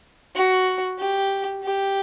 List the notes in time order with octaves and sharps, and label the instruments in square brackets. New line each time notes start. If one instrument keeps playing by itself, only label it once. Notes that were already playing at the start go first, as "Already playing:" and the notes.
[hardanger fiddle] F#4
G4
G4